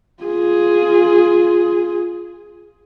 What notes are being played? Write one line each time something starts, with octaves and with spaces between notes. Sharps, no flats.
F4 G#4